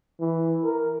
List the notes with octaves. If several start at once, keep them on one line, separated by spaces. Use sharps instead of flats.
E3
A#4